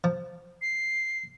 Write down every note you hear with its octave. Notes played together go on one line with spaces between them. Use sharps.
F3
C7